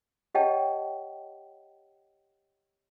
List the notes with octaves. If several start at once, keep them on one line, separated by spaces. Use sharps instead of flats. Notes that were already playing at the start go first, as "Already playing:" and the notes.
G4 C#5 D#5 F#5 G5 A5